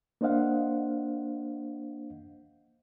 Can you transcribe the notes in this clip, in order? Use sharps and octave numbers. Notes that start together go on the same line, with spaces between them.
A#3 D4 C5 D#5 F5 F#5